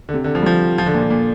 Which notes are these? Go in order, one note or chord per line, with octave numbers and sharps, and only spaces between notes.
D3
C3
D3
F3
G3
F3
F3
D3
A#2
D3
A#2